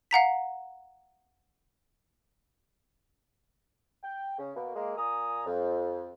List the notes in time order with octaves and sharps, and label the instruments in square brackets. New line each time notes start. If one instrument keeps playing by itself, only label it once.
[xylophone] F5 F#5 A#5 B6
[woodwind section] G5
C#3
B2 A#3
G#3 A#3
A#2 G#5 A#5 D#6
F2